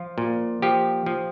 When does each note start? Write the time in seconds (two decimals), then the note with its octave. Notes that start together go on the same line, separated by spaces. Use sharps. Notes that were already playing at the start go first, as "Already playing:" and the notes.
Already playing: F3 F4
0.18 A#2
0.62 F3 G4
1.06 F3